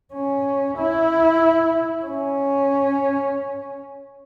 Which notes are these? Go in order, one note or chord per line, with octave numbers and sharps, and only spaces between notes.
C#4
E4
C#4